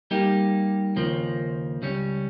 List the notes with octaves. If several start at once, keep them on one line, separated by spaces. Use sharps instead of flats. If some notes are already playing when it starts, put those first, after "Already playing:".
G3 A#3 D#4 G4
D#2 C#3 F3 A#3
C#2 C#3 G3 C#4